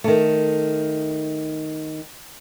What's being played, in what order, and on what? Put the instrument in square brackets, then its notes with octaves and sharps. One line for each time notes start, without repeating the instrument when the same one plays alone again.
[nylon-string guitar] D#3 A3